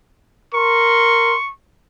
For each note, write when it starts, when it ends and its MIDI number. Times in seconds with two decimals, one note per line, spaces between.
0.54 1.36 70
0.54 1.36 84
0.54 1.50 85